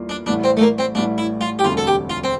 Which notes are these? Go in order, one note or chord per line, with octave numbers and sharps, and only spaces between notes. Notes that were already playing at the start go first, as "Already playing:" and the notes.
Already playing: E2 E3 G3 A#3 F4
D4
A1 A2 E3 G3 D4
C4
A3
A#3
C4
A1 A2 E3 G3 D4
E4
F4
G4
E1 D2 D3 G3 C4 F4
A4
G4
F4
C4